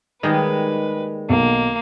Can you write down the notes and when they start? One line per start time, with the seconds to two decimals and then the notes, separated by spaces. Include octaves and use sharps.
0.23 D#2 D#3 G3 G#3 G#4 B4 D#5
1.30 B1 A#3